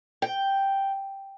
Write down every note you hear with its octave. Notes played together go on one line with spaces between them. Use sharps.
G5